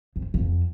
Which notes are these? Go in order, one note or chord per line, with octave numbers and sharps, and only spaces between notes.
F2
F2